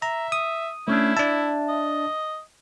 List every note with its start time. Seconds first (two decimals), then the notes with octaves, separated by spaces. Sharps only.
0.02 E5 A#5
0.32 D#6
0.88 A3 C#4 D4 E4
1.17 D4 E5 A5
1.69 D#5